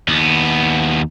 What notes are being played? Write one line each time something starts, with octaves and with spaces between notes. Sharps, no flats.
D#2 B3